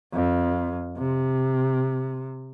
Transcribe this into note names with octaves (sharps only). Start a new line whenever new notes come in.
F2
C3